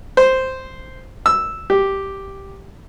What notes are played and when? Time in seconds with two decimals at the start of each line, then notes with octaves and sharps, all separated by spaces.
0.17 C5
1.26 E6
1.70 G4